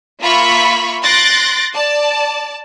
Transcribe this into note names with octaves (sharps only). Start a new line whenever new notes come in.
A#3 F4 E5 B5 C#6
C6 F#6 A6 A#6 D7
D5 A5